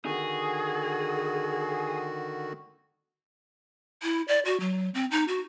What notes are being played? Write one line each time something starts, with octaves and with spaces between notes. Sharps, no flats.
D3 D#3 F#4 G#4
E4
D5
F#4
F#3
C4
D#4
F#4